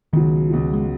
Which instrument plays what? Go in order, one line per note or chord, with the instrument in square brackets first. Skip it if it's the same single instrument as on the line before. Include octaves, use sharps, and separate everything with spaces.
[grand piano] C#2 B2 F#3 [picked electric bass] D#3
[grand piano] C#2 B2 F#3
[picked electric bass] G#3